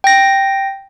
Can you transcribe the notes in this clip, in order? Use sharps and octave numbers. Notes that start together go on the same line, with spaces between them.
G5 A#6